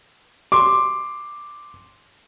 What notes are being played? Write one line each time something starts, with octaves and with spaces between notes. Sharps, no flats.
C6 D6